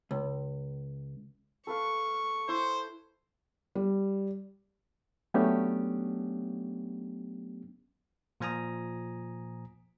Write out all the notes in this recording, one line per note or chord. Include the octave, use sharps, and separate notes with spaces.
C#2
A4 B4 F5 C#6
E4 C5
G3
F#3 A3 B3 C#4 D4 G4
A#2 F3 G#5 A#5 D#6